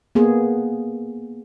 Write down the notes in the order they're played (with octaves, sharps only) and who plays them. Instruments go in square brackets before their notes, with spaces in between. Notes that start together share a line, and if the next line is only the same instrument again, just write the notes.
[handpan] A#3 B3 G#4